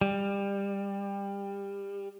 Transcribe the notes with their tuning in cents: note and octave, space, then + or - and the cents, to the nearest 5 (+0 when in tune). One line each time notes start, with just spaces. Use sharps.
G3 +25